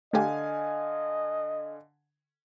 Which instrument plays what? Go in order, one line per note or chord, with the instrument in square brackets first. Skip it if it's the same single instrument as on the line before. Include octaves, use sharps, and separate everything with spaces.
[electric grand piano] D3 F5 G#5 [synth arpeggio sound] A3 G4 [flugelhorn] D#5